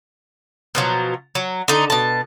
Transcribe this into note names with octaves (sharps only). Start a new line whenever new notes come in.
B2 F3 F#3
F#3
D3 D#4
B2 A5